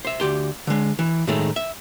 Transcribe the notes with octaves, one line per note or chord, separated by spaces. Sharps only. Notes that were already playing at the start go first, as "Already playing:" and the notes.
C5 E5
D2 G4 C6
D3 G#3
E3
A2 D#3 G#3 A3
E5